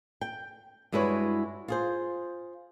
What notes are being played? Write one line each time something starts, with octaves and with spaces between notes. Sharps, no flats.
G5
G2 G#3 E4 F#4 B4 C#5
F4 G#4 C5